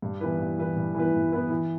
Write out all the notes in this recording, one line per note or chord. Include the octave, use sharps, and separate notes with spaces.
G2
E3 B3 E4 B4
G2
E3 B3 E4 B4
G2
E3 B3 E4 B4
G2
E3 B3 E4 B4
E3